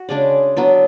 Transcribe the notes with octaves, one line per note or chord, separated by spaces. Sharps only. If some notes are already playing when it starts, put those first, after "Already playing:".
Already playing: F#4
C#3 G#3 D4 D5
F#3 B3 D4